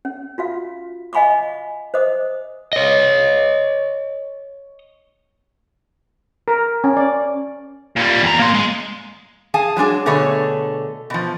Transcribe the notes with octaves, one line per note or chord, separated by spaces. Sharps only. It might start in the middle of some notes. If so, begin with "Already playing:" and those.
C#4
F4 F#4 F5
D#5 F5 G#5 B5 C#6 D6
C5 D#5 D6 D#6
C#5 D#5
A#4
C#4
D5
A#2 G3
E2 A#5
A#3 C6
G#3
G#4 F5 G#5 A5
F#3 G#3 D4 G#4
B2 D3 A3 G#4 C#5
B2 F3